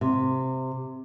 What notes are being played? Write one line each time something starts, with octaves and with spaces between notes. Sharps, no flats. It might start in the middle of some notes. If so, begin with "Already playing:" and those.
C3